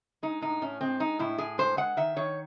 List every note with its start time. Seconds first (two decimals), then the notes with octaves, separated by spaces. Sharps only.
0.23 G#3 D#4
0.42 A2 D#4
0.62 A2 C#4
0.81 G#3 C4
1.00 G#3 D#4
1.19 A2 E4
1.38 A2 G#4
1.58 G#3 C5
1.77 G#3 F#5
1.97 D#3 E5
2.16 D#3 C#5